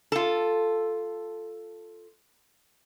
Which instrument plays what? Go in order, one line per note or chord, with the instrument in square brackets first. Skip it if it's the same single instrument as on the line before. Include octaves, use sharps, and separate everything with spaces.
[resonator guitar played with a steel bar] F4 A4